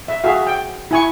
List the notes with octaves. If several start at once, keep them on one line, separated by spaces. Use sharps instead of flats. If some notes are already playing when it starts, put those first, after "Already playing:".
E5
F#4 G#4 E5 F5
G5
E4 G#5 C#6